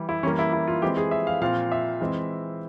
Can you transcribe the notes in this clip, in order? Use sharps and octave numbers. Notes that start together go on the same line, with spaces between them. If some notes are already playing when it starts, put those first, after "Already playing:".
Already playing: E3 G3
E4
E3 G3 A#3 C#4
E4
E4
F4
E3 G#3 C4 G4
G#4
E5
F5
A#2 F3 C4 F5
E5
E3 G#3 C4